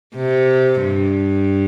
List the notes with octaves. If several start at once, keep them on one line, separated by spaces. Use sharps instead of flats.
C3
G2